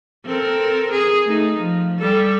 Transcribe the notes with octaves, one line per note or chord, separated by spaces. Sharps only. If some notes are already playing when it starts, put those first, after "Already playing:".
C4 A4 A#4
G#4
A3 D#4
F3
G3 A4